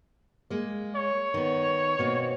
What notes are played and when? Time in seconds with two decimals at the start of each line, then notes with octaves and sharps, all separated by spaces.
0.50 G#3 A#3
0.95 C#5
1.34 D#3 B3
1.99 B2 A#3 C4